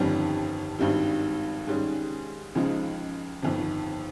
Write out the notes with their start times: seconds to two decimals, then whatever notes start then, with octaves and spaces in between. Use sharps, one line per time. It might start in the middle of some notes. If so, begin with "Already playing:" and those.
Already playing: G1 F2 D#3 G3 C#4
0.79 G#1 G2 D#3 G3
1.67 G#2 D#3 G3 C#4 G#4
2.55 C#2 C#3 F3 G#3 D#4
3.43 G1 F2 D#3